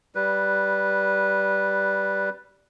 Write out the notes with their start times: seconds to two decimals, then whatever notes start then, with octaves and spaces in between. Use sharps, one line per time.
0.15 G3 B4